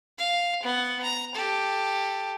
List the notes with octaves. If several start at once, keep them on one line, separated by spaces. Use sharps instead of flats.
F5
B3 F#5
A#5
G4 A4